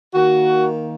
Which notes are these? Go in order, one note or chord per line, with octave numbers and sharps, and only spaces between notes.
D#3 A#3 F#4